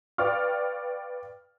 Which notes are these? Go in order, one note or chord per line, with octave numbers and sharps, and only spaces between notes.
B4 D5 F5 G5 C#6 F6